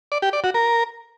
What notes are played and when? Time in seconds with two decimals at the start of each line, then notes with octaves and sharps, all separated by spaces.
0.12 D5
0.22 G4
0.33 D5
0.44 F#4
0.54 A#4